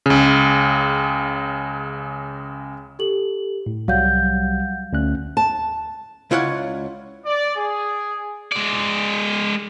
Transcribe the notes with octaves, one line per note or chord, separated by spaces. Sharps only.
C#2 C#3
G4 A4 F#7
A2
C2 F#3 G3 F5 F#5 G6
D2 C#4 F#6
A5
C#2 E4 F4 C#5 D5 F#5
D5
G#4
G#3 D5